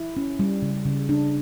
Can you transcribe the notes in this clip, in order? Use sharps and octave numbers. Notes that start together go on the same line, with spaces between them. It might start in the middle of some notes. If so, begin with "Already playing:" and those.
Already playing: E4
C#4
G3
C#3
C#3
D4